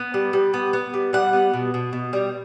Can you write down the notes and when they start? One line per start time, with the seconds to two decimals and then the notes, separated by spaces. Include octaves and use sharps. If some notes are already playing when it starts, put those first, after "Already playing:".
Already playing: B3
0.14 G3
0.33 G3
0.54 B3
0.73 B3
0.94 G3
1.13 G3 F#5
1.33 B3
1.53 B2
1.74 B2
1.93 B2
2.13 G3